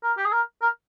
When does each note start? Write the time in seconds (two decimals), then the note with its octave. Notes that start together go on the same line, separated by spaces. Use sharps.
0.03 A#4
0.17 G4
0.25 G#4
0.32 A#4
0.62 A#4